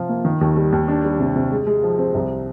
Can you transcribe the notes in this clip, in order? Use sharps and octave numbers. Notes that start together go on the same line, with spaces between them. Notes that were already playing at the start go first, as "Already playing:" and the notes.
Already playing: C3 F3 F4
A#3
D#3
D#2
G3
D#2
D4
G3
C3
C3
G#3
G#3
F3
C4
C2